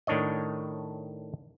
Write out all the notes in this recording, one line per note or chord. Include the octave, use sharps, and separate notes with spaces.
A2 D#3 D4 C#5 D#5